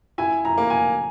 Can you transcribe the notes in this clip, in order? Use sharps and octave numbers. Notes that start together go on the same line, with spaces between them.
E4 G#5
A#5
A#3
G#5